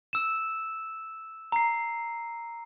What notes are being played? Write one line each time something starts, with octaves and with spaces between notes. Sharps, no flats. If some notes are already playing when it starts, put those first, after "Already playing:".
E6 E7
A#5 C7